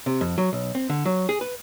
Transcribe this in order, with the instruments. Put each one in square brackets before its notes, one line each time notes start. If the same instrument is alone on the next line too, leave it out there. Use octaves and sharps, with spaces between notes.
[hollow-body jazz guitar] C3
F2
F#3
B1
C4
D3
F#3
G#4
B4